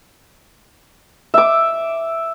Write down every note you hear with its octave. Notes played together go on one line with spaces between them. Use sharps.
E5 D6